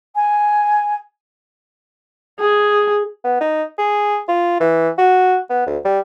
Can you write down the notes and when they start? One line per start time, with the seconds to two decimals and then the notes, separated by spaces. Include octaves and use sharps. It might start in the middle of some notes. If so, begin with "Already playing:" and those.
0.15 G#5
2.40 G#4
3.24 B3
3.41 D#4
3.78 G#4
4.28 F4
4.60 E3
4.98 F#4
5.50 B3
5.66 D2
5.85 G3